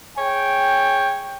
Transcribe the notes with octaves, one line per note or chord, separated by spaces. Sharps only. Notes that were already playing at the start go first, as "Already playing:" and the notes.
G#4 C#5 G5